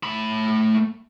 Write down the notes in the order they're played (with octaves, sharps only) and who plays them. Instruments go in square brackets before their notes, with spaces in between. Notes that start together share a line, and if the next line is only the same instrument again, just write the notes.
[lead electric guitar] A3 B5